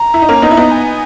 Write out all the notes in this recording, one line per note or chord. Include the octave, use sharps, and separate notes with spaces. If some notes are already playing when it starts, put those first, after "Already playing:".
Already playing: A#5
E4
D#4
A#3 C#4
B3 D#4
E4
B3 D#4
G#5